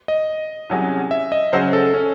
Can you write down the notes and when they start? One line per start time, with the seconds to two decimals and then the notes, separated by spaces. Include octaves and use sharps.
0.08 D#5
0.70 C2 C3 F#3 C#4 G#4
1.11 E5
1.32 D#5
1.52 C#3 F#3 C#4 C5
1.73 A4
1.94 C#4